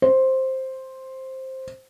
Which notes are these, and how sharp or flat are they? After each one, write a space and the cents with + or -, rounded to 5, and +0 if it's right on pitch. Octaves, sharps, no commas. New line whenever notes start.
C5 +5